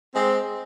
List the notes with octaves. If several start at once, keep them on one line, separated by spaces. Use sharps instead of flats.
G#3 C4